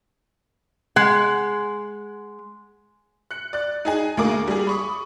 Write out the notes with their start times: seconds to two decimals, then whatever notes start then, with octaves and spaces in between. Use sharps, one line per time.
0.96 G#3 F#5
3.31 F#6 C#7
3.53 D5 F#6
3.85 D#4 G#4 G#5
4.17 D2 A#3 G#4 A#4 D6
4.48 G3 G#4
4.67 B5 C#6 D#6